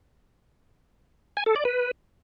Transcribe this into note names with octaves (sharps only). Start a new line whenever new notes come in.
G#5
A4
D5
B4